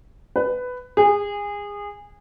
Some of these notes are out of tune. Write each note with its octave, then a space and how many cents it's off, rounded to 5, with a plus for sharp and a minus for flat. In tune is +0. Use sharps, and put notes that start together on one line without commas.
B4 +15
G#4 -25